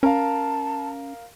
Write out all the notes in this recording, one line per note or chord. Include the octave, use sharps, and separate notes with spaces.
C#4 A#4 F5 A5